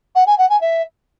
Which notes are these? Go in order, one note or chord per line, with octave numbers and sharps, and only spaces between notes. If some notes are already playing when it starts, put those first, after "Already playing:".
F#5
G#5
F#5
G#5
E5